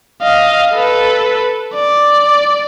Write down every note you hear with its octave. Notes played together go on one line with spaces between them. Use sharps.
D#5 F5
A4 B4
D5